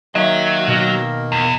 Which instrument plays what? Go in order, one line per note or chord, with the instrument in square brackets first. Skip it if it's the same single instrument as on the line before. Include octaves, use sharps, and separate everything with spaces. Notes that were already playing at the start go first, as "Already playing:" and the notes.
[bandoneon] D#3 A#3 [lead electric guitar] F#3 [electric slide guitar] D#5 E5
[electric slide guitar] B2 D#5
[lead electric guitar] E2